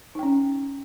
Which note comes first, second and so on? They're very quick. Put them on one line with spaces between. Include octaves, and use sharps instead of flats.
D#4 G5 C#4